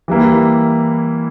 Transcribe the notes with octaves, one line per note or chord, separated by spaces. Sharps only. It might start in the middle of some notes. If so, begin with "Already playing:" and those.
E3 G3 A#3 E4